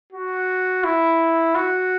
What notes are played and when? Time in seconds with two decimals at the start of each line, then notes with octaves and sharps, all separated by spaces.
0.13 F#4
0.84 E4
1.55 F#4